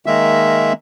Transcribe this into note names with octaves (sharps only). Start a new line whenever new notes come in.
D#3 G#3 A#3 E5